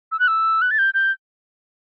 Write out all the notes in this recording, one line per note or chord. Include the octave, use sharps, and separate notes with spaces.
E6
F#6
E6
F#6
A6
G6
G6